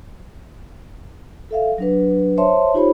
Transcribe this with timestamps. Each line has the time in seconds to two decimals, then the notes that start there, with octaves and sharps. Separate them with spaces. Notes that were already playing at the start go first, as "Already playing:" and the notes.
1.51 A4 E5 F5
1.78 F#3 D4 B4
2.38 C5 C#5 E5 A5 C6
2.74 D#4 F4 G4 C5 C#5 B5